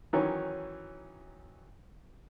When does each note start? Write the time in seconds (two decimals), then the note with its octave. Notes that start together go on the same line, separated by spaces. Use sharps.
0.13 D#3 E3 F#3 C#4